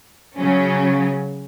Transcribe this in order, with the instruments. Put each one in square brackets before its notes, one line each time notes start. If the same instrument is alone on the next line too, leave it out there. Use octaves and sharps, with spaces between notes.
[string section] C#3 F#3 C#4